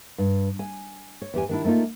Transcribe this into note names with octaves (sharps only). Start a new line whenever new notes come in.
G2
G#5
C#5
E2 G4 G#5
D#3 D4 E4
A3 A#3 D4 D#4 F4